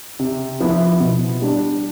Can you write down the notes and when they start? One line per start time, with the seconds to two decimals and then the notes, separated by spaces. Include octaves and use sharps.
0.19 C3
0.60 F3 B3 E4
1.00 B2
1.42 G3 D4